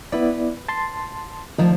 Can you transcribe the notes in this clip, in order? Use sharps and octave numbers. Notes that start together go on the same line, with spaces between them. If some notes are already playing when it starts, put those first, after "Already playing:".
B3 E4 B4 D5
A5 C6
D2 D#3 F3 D#4 F4